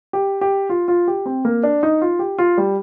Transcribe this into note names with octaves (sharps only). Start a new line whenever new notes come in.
G4
G4
F4
F4
G4
C4
A#3
D4
D#4
F4
G4
F4
G3